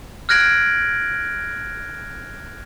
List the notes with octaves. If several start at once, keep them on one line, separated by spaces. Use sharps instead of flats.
F6 F#6 G#6 A#6 D7 F#7